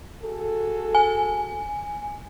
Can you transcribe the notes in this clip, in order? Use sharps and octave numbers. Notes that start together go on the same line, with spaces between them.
F#4 G#4 A4
G#5